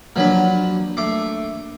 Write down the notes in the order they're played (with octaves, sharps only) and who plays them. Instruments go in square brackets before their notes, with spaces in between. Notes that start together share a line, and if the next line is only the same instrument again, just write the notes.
[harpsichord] F3 F#3 B4 [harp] A#3 D4
[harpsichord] A3 D6 [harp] C7